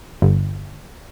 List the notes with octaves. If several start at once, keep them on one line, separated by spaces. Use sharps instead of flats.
G1